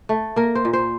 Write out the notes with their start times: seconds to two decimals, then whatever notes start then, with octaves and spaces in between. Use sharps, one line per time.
0.09 A3
0.36 A#3 A#4
0.55 C5
0.65 A#2
0.73 C5